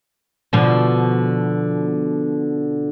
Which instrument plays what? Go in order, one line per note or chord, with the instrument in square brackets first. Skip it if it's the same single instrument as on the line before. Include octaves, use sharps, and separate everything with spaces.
[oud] B2 D3 F3